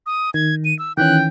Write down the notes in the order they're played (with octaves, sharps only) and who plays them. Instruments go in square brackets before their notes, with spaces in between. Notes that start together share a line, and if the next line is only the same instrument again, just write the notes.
[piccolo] D#6
[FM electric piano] D#3 [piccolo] G#6
[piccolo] D#7
E6
[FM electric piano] D#3 E3 C#4 [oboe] G5 [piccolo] F#6